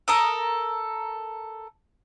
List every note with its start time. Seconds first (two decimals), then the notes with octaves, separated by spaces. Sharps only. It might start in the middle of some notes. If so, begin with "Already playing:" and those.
0.08 A4 A#4 D#6